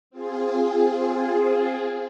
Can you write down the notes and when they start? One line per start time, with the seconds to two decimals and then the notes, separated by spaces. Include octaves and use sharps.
0.10 C4 F4 G#4